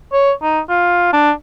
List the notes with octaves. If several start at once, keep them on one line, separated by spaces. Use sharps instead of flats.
C#5
D#4
F4
D4